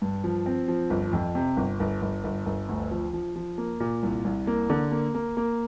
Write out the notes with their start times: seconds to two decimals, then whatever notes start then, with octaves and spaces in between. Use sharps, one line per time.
0.02 G2
0.24 F3
0.46 C4
0.68 F3
0.90 G1
1.13 F2
1.35 C3
1.57 G1
1.80 G1
2.02 G1
2.24 G1
2.46 G1
2.69 D2
2.91 F3
3.13 F3
3.36 F3
3.58 A#3
3.80 A#2
4.03 C2
4.25 C2
4.47 A#3
4.70 D3
4.91 A#3
5.15 A#3
5.37 A#3